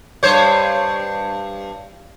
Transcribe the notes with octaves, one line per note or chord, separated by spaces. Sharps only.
G2 C5 C#5